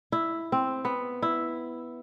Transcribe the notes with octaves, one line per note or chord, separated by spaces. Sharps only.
E4
C4
B3
E4